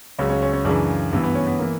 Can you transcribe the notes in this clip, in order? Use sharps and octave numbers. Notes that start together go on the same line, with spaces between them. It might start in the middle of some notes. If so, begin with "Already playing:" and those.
C#2 C#3 F#3 C#4
C#4
C#4
C#4
F#2 C#3 E3 D4
G2 E3 B3
B3
C#4
B3
E3 A#3